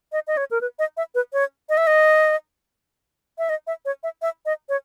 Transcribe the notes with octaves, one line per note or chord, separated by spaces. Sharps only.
D#5
D#5
C#5
A#4
B4
D#5
E5
B4
C#5
D#5
E5
D#5
E5
D#5
E5
C#5
E5
E5
D#5
C#5